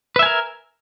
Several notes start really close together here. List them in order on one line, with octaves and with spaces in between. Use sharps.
B4 E5 G#5 A#4